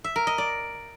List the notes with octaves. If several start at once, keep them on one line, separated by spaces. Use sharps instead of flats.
E5
A#4
D#5
D5